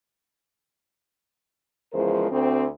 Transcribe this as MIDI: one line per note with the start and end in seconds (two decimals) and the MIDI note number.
1.93 2.30 40
1.93 2.30 49
1.93 2.30 53
1.93 2.30 56
1.93 2.30 70
1.93 2.30 72
2.30 2.65 38
2.30 2.65 60